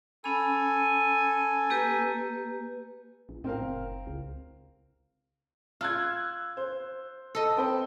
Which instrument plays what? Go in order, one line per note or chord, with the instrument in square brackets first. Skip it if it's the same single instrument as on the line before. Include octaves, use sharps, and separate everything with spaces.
[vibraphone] C#4 B5 [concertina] A4 G#5
[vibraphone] A#3 G4 B4
[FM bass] A#1
[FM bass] A2 [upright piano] C4 A#4 F5
[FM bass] F#1
C#2
[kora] F4 [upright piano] E6 F#6 G#6
[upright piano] C5
[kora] A4 D#5
[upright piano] C4 G5 B5